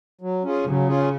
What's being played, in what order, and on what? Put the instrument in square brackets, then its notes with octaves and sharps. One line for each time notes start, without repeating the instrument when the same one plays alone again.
[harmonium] F#3
C#4 F4 G#4
[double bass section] C#3 [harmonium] F#3
[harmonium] C#4 F4 G#4